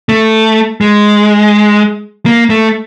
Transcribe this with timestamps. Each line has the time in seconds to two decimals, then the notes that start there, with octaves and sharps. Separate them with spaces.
0.09 A3
0.81 G#3
2.26 A#3
2.50 A3